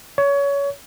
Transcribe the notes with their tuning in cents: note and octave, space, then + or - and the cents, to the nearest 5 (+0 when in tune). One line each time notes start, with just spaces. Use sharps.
C#5 +25